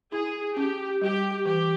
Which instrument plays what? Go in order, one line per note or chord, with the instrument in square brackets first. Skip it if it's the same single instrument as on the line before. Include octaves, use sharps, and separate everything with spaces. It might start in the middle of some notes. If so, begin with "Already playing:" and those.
[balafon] E4 [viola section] G#4
[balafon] C#4 [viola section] G4
[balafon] G3 [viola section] G4
[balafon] E3 [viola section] G4